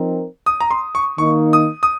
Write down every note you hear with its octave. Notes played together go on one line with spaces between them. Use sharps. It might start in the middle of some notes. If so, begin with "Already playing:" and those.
Already playing: F3 C4 D#4 A#4
D#6
A#5
C6
C#6
D#3 A#3 D#4 C#6
D#6
D#6